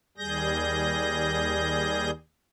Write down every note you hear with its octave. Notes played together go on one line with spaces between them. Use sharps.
D#2 G3 G#4 G6 A#6